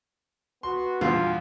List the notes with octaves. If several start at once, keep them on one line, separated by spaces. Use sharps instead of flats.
B3 F#4 C6
E2 G2 A#2 F4